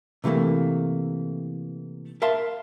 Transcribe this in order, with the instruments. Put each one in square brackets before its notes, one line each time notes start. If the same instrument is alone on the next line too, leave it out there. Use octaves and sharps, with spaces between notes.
[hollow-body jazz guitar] C3 E3 F#3 A3 A#3
A#4 E5 F5 A5 C6